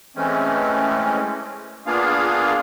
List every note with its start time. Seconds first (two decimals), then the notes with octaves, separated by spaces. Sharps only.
0.16 E3 G#3 A3 C4 C#4
1.86 A#3 B3 D4 F4 G#4 F5